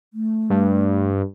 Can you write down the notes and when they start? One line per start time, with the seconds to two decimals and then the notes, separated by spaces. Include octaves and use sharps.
0.14 A3
0.50 G2